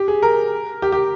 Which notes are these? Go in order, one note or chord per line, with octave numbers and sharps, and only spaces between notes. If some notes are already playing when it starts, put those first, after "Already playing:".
Already playing: G4
G#4
A#4
G4
G4